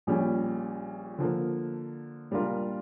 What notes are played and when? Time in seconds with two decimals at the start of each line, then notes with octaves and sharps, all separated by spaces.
0.07 A#1 A#2 G3 C#4
1.18 D3 F3 A#3
2.31 A#2 G3 D4 F4 A#4